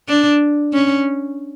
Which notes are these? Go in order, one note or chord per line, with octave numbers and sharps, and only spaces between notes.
D4
C#4